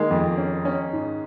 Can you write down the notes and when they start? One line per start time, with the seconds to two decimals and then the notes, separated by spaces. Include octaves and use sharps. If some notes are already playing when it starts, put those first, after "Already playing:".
Already playing: D#3 G#3 A#3
0.11 F2
0.38 C#4
0.65 C#4
0.93 G#2